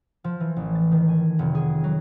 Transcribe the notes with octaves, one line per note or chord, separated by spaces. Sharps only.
F3
E3
A1
A6
D#3
G#5
F1
G#4
F#3